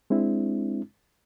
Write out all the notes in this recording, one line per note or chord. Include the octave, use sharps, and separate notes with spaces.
G#3 C4 D4 E4